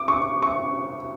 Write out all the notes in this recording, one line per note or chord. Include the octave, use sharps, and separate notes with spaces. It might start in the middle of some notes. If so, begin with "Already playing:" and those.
Already playing: D6
C#6
C#6